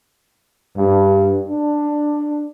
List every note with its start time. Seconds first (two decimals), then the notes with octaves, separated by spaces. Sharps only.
0.77 G2
1.49 D4